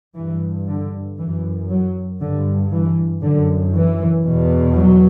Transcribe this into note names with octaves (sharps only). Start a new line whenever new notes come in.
G2 E3
D3
F#2 E3
F#3
G2 D3
E3
F#2 D3
E3
E2 B2
F#3